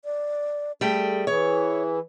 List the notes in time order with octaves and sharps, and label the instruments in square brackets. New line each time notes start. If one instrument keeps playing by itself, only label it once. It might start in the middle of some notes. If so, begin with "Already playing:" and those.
[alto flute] D5
[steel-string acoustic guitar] G3 A3 G5 [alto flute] G#4
[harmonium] E3 [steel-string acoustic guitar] C#5